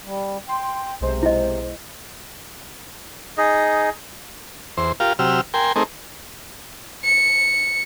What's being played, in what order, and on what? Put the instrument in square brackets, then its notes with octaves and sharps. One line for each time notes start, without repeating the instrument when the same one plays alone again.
[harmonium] G3
[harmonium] G5 [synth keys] C6
[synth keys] B1 G#3 C5 [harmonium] C3
[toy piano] E4 D#5
[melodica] D#4 G#4 D#5
[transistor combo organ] E2 C5
F4 G4 A#4 F5
C3 F#3 G4 E6 F6
A#4 G5 G#5 C6
A3 C4 D#4 G#4 A#4
[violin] C#7